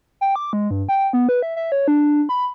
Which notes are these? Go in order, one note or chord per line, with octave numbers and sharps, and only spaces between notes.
G5
D6
G#3
G2
G5
B3
B4
E5
E5
C#5
D4
B5